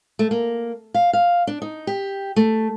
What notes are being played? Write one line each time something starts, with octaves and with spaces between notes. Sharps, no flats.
A3
A#3
F5
F5
D4
D#4
G4
A3